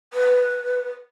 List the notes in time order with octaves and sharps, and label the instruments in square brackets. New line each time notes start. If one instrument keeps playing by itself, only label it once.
[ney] B4